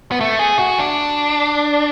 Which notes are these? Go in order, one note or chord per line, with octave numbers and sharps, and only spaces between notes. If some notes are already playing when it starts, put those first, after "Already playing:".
B3
A3
G#4
F#4
D4